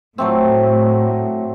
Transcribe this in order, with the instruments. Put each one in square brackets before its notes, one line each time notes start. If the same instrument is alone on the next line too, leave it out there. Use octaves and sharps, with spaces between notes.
[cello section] A2 [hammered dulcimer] F#3 A3 C4